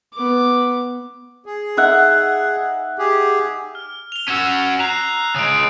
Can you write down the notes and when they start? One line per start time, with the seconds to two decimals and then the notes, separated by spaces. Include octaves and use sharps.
0.13 B3 D6
1.46 G#4
1.77 D#4 E5 F#5
2.99 G4 G#4
3.75 F6
4.12 F7 G7
4.28 C#4 F#4 E6 F6
4.80 A#5 F#6 C7
5.36 C#3 G#3 D#6 D7